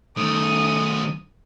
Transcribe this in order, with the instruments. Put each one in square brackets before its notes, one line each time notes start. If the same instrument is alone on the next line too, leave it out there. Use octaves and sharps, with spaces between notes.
[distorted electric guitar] D#3 A3 [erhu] D#6